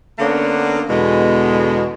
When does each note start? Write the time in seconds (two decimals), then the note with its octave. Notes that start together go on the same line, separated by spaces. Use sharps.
0.19 D3 A#3 B3 C#4 D4
0.88 E2 B2 D3 G#3